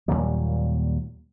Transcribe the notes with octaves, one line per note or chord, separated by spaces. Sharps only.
D#2 A#2 F#3 G3